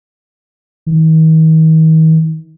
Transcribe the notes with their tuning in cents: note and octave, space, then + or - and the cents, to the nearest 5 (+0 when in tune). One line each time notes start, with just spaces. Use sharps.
D#3 +40